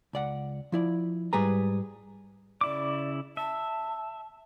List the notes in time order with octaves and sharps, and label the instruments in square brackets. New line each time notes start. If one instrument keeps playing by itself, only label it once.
[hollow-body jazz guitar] C#2 D5 F#5
F3 E4 D5
G#2 G3 G#4 B4 A#5
[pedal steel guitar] C#3 E4 D6 [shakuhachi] D5
[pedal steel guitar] E5 [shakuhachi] A5